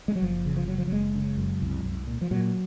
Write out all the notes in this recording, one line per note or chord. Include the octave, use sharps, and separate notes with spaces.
G#3
F#3
F#1 F3
C#3
F3
C#3 F#3
F3
F#3
F#1 G#3
C#3
F#2
C2
C2
A#2
F3
A#2 F#3